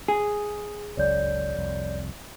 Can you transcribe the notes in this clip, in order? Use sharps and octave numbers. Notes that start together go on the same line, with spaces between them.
G#4
F#1 C#2 F#2 C#5 D5 G6
C2 F2